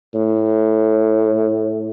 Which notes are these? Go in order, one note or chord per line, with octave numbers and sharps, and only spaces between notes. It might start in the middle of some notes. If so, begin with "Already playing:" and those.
A2